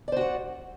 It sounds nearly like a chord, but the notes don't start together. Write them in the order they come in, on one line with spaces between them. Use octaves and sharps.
D5 C5 F#4 F#5